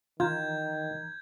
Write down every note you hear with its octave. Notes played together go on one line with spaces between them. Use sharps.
D#3 E3 F4 A#5 G6 G#6